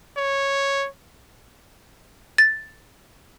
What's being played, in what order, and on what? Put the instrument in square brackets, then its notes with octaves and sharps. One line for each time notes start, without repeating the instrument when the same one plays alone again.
[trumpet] C#5
[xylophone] A6